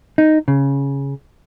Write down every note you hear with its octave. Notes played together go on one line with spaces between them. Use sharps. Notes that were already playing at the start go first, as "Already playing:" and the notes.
D#4
C#3